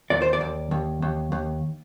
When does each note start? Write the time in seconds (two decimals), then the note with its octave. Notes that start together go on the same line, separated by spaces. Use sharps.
0.10 D#2 D5
0.22 C5
0.33 D5
0.41 D#2
0.71 D#2
1.02 D#2
1.32 D#2